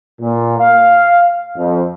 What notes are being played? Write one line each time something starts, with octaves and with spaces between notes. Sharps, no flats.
A#2
F5
F2